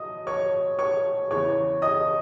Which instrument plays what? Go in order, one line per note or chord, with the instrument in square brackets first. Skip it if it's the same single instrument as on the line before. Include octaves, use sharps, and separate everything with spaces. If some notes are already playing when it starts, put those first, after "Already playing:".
Already playing: [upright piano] F#3 D#5 D#6
C#5 C#6
C#5 C#6
E2 C#3 E3 C#5 C#6
D#5 D#6